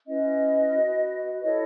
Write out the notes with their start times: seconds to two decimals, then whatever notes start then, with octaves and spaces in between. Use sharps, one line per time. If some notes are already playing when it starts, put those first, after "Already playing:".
0.07 C#4 E4 B4 D#5
0.74 F#4 B4
1.43 E4 A4 C#5 D#5